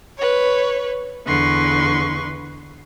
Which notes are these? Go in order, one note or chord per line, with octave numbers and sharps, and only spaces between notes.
B4 C#5
E2 D3 B4 C6 C#6